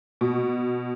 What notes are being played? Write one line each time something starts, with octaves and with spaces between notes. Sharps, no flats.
B2